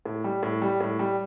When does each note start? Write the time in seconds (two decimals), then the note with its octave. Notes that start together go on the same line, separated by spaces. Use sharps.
0.05 A2
0.24 G3
0.43 A2
0.62 G3
0.80 A2
0.99 G3